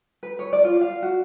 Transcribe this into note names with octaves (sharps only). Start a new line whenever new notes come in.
B4
C#5
D5
F4
F5
F#4